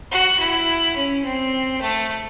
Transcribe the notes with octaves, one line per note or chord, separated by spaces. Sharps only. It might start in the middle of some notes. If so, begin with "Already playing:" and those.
F#4
E4
C#4
C4
A3